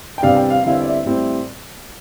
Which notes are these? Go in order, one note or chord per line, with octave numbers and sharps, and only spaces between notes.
G5
E2 C3 G3 D4 F5
G5
F5
E2 D3 G3 C4 E4 F5
E5
D5
E5
A2 G3 C4 E4